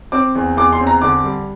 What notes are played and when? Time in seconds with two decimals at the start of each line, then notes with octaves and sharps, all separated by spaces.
0.12 C4 D6
0.35 E2
0.57 E2 D6
0.73 C6
0.80 C4
0.87 A#5
1.02 D3 D6
1.24 G3